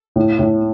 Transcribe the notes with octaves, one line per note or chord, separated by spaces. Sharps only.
A2
A2